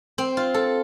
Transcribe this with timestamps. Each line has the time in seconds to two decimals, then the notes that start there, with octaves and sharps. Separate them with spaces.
0.18 C4
0.37 F4
0.54 A4